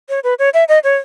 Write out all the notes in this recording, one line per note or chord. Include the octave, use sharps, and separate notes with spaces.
C#5
B4
C#5
E5
D#5
C#5